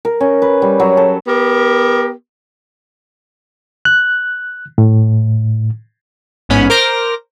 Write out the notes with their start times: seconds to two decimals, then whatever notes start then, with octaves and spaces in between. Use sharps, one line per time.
0.05 A#4
0.21 C#4
0.42 B4
0.62 G3
0.80 F#3
0.97 A4
1.27 B3 G4 A#4
3.85 F#6
4.78 A2
6.49 A1 G#2 B3 C#4 B5
6.70 A#4 C5 D6 F6 G6 A#6